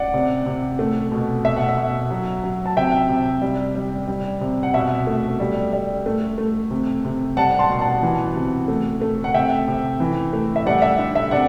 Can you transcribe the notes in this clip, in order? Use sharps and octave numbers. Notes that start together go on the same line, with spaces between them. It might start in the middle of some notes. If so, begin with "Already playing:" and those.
Already playing: D5 F#5
C3
C3
A3
B2
B2 E5
F#5
E5
B2
F#3
F#3
A5
C3 E5 G5
C3
G3
G3
G3
C3
F#5
B2 E5
A3
G3
G3
A3
A3
C3
C3
G3 F#5 A5
A5 C6
B2
F#5 A5
E3
C3
A3
A3
F#5
C3 E5 G5
C3
E3
A3
E5
G3 D5 F#5
E5
D3
E5
C3 D5 F#5